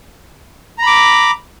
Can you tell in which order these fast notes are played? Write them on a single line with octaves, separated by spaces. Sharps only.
A#5 B5 D6